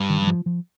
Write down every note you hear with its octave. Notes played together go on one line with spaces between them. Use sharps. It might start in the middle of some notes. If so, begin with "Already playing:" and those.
Already playing: G2
D#3
F#3
F3
F3